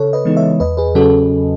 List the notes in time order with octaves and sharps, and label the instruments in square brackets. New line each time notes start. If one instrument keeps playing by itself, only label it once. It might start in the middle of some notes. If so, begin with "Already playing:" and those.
Already playing: [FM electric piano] C#3 A4 C#5
B4 D#5
E3 G#3 B3 D#4
C#5 E5
E2 B4 D#5
G#4 B4
C#3 F#3 C#4 F#4 A4